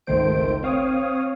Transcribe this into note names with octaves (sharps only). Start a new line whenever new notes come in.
G#1 C#2 D#3 A3 C5 D7
C4 C#5 F5 D#6